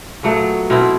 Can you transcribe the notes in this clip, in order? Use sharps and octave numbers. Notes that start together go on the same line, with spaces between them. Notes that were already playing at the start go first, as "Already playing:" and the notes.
A#2 F#3 A3 B3
B2 C4 E4